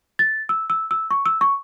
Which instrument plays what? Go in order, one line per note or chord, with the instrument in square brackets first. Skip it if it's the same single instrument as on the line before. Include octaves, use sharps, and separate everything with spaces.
[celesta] A6
E6
E6
E6
C#6
E6
C#6